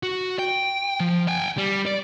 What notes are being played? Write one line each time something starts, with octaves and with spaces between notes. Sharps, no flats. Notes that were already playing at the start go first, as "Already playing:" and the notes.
F#4
G5
F3
G5 G#5
G3
D5